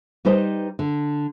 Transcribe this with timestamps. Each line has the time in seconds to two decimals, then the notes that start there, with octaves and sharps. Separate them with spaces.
0.25 G3 D#4 G4 B4 C5 D#5
0.79 D3